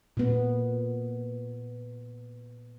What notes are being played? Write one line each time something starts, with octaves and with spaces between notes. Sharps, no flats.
A#2 B3